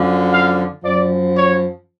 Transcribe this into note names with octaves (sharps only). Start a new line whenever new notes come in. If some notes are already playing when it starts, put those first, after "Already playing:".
Already playing: F#2 D3 F3
F5
F#2 F3 D5
C#5